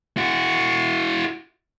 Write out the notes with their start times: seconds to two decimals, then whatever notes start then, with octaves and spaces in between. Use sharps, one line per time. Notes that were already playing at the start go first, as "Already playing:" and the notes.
0.17 E4 F#4